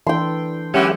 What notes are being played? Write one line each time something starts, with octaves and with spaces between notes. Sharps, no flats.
E3 D4 A4 G5 C6
E3 F#3 G#3 A#3 C#4 G4 E5 F#5